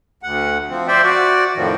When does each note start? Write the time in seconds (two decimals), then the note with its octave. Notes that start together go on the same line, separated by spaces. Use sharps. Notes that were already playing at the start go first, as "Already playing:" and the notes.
0.23 D2 F#5
0.70 F3 C4
0.88 C5 D5 E5 G5
1.03 F#4 D5
1.56 F2 A2 D#3 F3